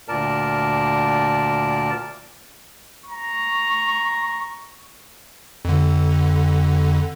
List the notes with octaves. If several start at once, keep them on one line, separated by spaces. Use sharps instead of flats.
D2 A#2 A#4 D5 A5
A#5 C#6
F2 D3